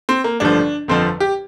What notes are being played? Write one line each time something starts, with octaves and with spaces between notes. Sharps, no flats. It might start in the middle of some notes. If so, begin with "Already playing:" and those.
C4
A#3
A1 G2 D3 F3 D4
G1 F2 D3 F3 C4
G4